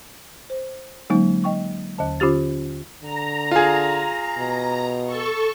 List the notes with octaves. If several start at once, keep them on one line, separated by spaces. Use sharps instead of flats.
C5
D3 F#3 G#3 A#3 C#4 D#4
D#5 G5 C#6
D#2 D3 A5
D3 C#4 F4 G4 A6
D3 A#5
F4 G#4
B2
A4 C#6